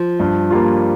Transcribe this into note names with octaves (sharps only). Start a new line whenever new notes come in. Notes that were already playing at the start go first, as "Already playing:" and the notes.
Already playing: F3
G2
G3 A#3 F4